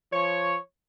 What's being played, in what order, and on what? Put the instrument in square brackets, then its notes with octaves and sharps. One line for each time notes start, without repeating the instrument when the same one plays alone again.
[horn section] F3 C#5